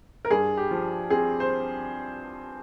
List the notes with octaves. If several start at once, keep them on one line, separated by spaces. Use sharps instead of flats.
A#4
G2 G#4
G4
F3
C4 G#4
C5